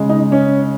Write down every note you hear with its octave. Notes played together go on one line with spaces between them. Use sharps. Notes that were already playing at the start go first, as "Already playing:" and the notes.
Already playing: C#3 G#3
D#4
C#4